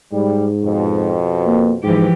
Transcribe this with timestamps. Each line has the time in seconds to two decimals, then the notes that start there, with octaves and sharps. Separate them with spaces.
0.13 G#2 G3
0.65 F2 B2
1.46 A#3
1.84 G#2 E3 F3 G4